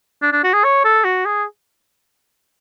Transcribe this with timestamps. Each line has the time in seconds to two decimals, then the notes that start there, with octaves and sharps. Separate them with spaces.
0.22 D4
0.33 D4
0.44 F#4
0.53 G#4
0.64 C#5
0.85 A4
1.04 F#4
1.26 G#4